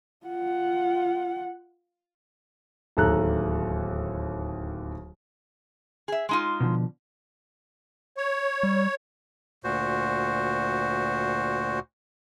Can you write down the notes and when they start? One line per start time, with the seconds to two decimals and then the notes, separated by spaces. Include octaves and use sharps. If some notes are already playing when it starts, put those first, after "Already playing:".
0.26 F4 F#5
2.97 D1 D#2 A4 A#5 F#6
6.08 G#4 E5
6.29 G#3 D#4 F4
6.60 B2 D3 F3
8.17 C#5
8.63 G3
9.64 D2 A#2 F#4 C5